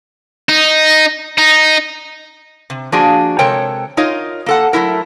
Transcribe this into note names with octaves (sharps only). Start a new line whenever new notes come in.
D#4
D#4
C3
F3 A#3 D4 F#4 G#4
C3 G#3 A4 A#4 C#5 G5
D#4 F4 A#4 C#5 D#5
A#3 A4 F#5
F#3 A3 E4 A#4